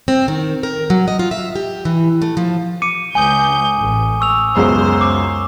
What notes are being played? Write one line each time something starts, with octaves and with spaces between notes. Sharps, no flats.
C4
D#3
A#4
F#3
D#5
F4
E5
G4
E3
A3
F3
D6 C#7 D#7
C#2 G#5 D#6 G6
A1
C#6 E6 F7
C#2 F#2 B3 C5
D6